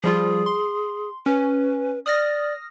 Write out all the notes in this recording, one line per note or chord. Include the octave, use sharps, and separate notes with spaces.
F3 G3 F4 G#4
C6
C#4 B4
D5 D#6 F6 A#6